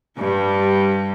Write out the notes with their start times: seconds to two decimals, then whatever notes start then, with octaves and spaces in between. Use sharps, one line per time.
0.18 G2 G3